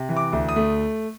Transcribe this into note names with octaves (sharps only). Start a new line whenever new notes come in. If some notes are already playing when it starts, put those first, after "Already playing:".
Already playing: C3
E3
D6
D2
D#6
A3